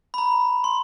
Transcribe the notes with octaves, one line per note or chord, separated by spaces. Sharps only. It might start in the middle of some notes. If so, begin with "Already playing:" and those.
B5
A#5
C6